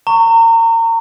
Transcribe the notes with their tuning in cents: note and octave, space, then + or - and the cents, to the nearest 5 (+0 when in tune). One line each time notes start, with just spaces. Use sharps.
A#5 -30 C#6 +0